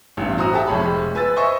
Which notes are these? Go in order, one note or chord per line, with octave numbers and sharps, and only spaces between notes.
A1 E2 G2
E4 F#4 C5 A#5 D#6
G4 A4 E5 A5
F1 G#3 C#5 B5
B4 G#5 E6 A6
C5 D#5 E5 G#5 C#6